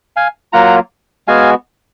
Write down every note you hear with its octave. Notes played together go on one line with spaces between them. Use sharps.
F5 G#5
F#3 A#3 F4 F#5 A#5
G#3 B3 F#4 F5 G#5